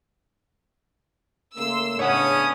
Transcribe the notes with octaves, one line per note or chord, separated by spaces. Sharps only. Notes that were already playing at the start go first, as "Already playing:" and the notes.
C#3 A3 A#3 C6 E6
A2 C#3 B3 C#4 D4 C#5 F#5 D#6